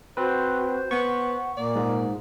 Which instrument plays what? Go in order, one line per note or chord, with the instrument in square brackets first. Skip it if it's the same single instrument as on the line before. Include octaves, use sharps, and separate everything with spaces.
[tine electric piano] C4 B4 [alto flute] F#4 [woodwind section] C5
[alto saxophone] B3 [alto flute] F#5 [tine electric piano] C#6
[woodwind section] A#2 [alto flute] A#3 [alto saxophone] D5
[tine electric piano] G#2